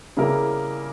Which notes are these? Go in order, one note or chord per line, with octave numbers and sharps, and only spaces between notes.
C#3 G3 A#3 E4 A#4